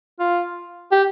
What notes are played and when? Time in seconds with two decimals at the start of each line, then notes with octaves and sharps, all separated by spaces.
0.19 F4
0.92 G4